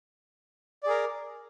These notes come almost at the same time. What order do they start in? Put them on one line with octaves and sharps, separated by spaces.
D5 G#4 A#4